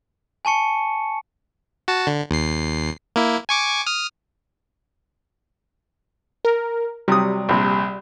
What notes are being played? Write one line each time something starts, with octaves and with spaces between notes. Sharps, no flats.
G#5 A5 C#6 C#7
F#4 A5
D3
D#2 C7
A#3 E4
G#5 C#6 D6
D#6 F6
A#4
C3 F#3 G3 D#6
A#1 C3